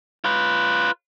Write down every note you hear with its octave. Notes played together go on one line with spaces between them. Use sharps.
F4 B4